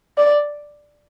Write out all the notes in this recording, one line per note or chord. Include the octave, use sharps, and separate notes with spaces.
D5